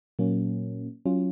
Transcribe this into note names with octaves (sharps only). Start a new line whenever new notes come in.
A#2 F#3 A#3 C#4
F#3 C#4 F4